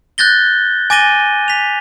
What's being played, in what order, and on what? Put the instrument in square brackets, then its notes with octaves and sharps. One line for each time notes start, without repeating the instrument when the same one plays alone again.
[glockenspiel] F#6 G6 A6 A#6 G7
G#5 D6 A6 A#6 D#7 G7
B6 F7